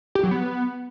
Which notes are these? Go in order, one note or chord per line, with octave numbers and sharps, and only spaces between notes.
G4
F#3
B3